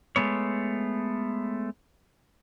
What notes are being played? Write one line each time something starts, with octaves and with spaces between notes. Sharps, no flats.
G#3 A3 B3 C#5